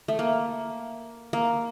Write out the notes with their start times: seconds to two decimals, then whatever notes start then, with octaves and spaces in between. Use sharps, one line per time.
0.08 A3
0.19 A#3
1.33 A#3